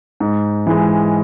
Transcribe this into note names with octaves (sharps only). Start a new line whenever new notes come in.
G#2
E3 G#3